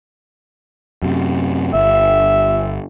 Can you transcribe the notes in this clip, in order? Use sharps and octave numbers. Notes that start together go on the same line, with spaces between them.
F#2 C3
G1 E5